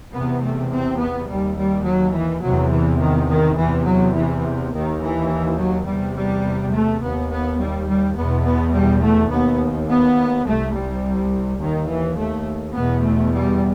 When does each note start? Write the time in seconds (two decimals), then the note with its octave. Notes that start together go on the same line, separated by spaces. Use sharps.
0.14 E2 C3 B3
0.42 A3
0.72 C4
0.99 B3
1.29 D#2 G3
1.58 G3
1.86 F#3
2.14 E3
2.43 E2 C3 F#3
2.72 E3
3.00 D#3
3.29 D#3
3.58 E2 C3 E3
3.86 F#3
4.15 E3
4.72 D#2 D#3
5.01 E3
5.58 F#3
5.86 E2 C3 G3
6.16 G3
6.73 A3
7.02 D#2 B3
7.30 B3
7.59 G3
7.87 G3
8.15 E2 B2 B3
8.45 B3
8.73 G3
9.01 A3
9.30 D#2 B3
9.88 B3
10.45 C2 C3 A3
10.74 G3
11.59 D#2 D#3
11.88 E3
12.17 A3
12.74 E2 B2 B3
13.03 A3
13.32 G3